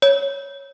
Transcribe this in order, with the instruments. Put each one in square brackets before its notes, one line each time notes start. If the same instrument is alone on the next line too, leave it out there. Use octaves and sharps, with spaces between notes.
[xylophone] C#5